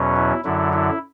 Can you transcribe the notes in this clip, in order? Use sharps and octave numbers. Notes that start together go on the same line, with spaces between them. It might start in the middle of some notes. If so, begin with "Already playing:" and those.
Already playing: E2 B2 F#3 C#4
E4
F#2 D3 F#3 E4
E4